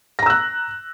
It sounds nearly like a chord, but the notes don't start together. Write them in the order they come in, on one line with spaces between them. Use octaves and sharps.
A#6 A#5 E6 F#6